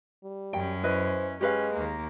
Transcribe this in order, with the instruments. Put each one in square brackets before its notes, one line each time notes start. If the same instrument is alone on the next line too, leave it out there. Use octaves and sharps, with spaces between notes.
[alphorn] G3
[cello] F#2 C#4 [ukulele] G5
[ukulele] E4 B4 D#5 [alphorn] C5
[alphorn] G#3 [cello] C#4 [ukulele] G4 B4 F5
[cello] D#2 A#3